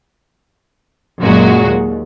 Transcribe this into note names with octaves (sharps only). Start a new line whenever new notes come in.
F#2 A#2 F#3 G#3 F#4
D#2